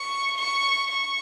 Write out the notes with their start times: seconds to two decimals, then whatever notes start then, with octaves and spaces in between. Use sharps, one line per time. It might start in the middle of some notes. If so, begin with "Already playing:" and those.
Already playing: C#6
0.38 C#6
0.91 C#6